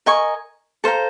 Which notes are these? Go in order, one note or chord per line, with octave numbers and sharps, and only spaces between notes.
A#4 D#5 G#5 C#6
A4 C5 F5 A#5